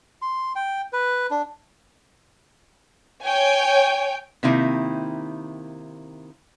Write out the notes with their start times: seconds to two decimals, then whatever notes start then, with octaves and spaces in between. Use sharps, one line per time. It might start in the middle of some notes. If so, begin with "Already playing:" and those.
0.22 C6
0.56 G5
0.93 B4
1.31 D4
3.23 C#5 G5 G#5
4.43 C3 D#3 A#3 C4 D#4 E4